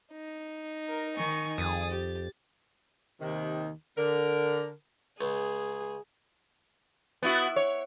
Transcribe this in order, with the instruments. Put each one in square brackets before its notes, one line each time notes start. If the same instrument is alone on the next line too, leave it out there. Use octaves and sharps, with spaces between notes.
[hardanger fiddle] D#4
[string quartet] A#4
D#3 G#5 C#6
[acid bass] F2 [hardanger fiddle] G#4 D#6 [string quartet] A6
[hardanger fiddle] G4
[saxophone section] D#2 C3 D#3
D3 A#4
[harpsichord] C#2 [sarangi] G#4
[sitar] B3 E4 F#4
C#5